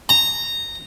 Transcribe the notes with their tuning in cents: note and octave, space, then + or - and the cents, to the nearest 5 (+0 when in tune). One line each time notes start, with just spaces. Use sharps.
A#5 -15